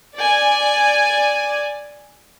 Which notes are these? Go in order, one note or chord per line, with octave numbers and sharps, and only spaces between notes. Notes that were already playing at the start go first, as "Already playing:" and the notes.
D5 G#5